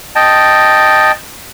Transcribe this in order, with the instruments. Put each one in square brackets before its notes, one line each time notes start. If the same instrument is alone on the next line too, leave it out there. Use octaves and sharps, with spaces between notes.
[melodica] D#5 G5 A5